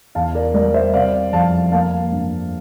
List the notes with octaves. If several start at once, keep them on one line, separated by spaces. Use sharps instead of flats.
E2 F5 A5
A#4 D5
G3 A#4 D5
C5 E5
C3 D5 F5
F2 F5 A5
A#3 F5 A5
G2